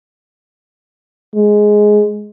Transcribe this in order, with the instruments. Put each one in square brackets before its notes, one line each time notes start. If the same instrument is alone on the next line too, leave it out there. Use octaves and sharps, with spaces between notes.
[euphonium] G#3